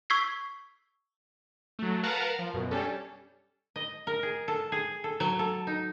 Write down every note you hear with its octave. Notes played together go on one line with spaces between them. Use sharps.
C#6 E6 G#6 B6 C7
F#3 A3
A#4 B4 F5 F#5 A5 A#5
F3
F#2 B2
G3 C#4 D4 A4
D#5
A#4
G#4
A4
G#4
A4
F#3
A4
D#4